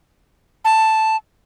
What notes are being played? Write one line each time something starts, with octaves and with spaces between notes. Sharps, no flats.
A5